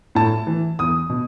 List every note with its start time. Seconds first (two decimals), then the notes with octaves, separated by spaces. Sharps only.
0.15 A2 A5
0.47 E3
0.79 E2 D#6
1.10 B2